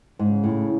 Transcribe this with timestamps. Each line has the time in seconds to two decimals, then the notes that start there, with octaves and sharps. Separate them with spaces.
0.19 G#2 C#3
0.44 A2